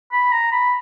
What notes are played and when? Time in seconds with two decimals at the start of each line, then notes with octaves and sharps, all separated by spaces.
0.12 B5
0.32 A#5
0.52 B5